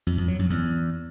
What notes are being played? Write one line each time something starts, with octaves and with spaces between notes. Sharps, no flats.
F2
F2
F#3
F#2
E2